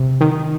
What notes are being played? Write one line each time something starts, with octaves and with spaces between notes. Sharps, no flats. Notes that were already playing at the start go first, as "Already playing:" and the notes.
Already playing: C3
D#3